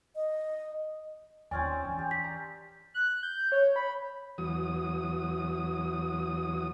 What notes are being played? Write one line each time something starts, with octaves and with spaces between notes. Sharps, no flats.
D#5
D#2 C4 C#4 F4 D5 G#5
E3 D4
G4
B6
A#5
F#6
G6
C#5
B5
E2 F#3 D#6